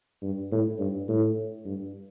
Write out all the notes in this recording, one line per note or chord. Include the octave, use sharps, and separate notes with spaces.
G2
A2
G2
A2
G2